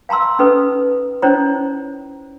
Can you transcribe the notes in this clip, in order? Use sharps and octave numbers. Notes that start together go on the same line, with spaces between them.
F5 A5 A#5 C6 E6
C#4 D#4 A4 B4
C#4 D#4 E4 C5 C#5 A#5